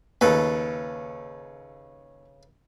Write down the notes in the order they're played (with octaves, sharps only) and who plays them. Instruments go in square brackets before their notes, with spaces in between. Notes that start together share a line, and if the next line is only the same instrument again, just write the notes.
[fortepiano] D#2 [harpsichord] C#3 A4 B4